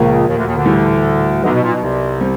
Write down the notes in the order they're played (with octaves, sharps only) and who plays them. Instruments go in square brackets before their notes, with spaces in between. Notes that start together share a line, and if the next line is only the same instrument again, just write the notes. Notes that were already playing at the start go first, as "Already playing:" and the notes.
Already playing: [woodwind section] C#2 C#3 [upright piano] A#2 F3 A#3
[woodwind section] D#2 D#3
D2 D3
D#2 D#3
D2 D3
[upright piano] A2 E3 G3
[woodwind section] D2 D3 [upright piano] F#3 B3 D#4 F#4
[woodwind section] B2
A#2
B2
C2 C3
[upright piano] G3 C4